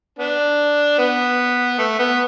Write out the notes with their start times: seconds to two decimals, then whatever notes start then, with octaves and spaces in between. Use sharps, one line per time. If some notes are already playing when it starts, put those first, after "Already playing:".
0.19 B3 D4
0.98 B3
1.79 A3
1.99 B3